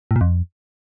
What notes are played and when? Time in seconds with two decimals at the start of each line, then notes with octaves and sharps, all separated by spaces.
0.11 A2
0.16 A#2
0.21 F2